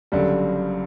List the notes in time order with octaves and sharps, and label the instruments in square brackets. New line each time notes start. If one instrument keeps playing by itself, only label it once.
[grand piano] F#1 F#2 D3 G3